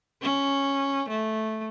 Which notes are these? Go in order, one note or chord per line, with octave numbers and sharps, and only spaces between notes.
C#4
A3